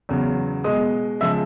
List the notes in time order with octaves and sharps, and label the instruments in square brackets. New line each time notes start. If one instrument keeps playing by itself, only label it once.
[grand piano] E2 C#3 F#3
B2 G#3 D#5 D#6
C#3 F3 G#3 E5 E6